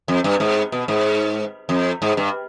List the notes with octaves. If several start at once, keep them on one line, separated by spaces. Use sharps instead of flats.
F2
G2
G#2
B2
G#2
F2
G#2
G2